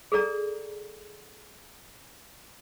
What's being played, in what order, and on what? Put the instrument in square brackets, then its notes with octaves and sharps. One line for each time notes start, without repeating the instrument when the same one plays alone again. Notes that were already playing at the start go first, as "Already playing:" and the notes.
[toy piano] G#4 A4 D5 A#5